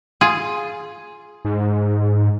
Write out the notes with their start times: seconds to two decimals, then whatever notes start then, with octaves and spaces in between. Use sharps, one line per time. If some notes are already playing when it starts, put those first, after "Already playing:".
0.21 F4 G#4
1.45 G#2